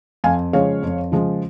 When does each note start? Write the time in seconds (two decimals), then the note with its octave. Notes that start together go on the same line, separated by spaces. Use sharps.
0.24 F2 F5 G#5
0.53 C#3 F3 G#3 C#5 F5
0.83 F2
1.12 C#3 F3 G#3